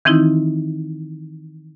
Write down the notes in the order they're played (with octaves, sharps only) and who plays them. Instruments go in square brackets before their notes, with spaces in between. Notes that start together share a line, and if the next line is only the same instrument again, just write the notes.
[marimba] D#3 E3 C4 D#4 E4